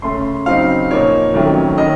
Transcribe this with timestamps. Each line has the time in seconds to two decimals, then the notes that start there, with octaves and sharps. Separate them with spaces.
0.02 C#3 A3 C#4 C6
0.46 C#3 F#3 C4 D#4 F5
0.90 A#2 F3 A#3 D#4 C#5
1.34 F2 D#3 F#3 A3 C#4
1.78 D#3 A#3 C#4 D#5